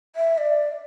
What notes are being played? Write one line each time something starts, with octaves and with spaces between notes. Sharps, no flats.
E5
D5